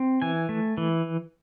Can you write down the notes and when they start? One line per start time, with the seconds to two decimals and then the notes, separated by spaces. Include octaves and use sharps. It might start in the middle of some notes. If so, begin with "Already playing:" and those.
Already playing: C4
0.22 E3 G#5
0.49 A3
0.77 E3